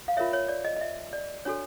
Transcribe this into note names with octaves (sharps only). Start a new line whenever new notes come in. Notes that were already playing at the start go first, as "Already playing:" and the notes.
F5
F4 A#4 C#5 E5
C#5
D5
D#5
D#5
E5
D5
D4 F#4 A4 C#5